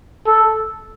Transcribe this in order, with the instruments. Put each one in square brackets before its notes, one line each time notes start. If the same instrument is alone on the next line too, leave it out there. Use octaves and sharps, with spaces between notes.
[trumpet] A4